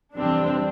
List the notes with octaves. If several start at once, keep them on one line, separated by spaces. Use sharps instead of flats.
F2 C3 E3 G3 C4 D4